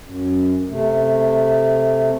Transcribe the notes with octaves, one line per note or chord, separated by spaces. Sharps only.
F#2
C3 A3